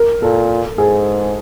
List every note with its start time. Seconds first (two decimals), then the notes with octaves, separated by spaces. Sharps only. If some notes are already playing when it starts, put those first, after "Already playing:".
Already playing: A#4
0.22 A#2 A4
0.78 G#2 G#4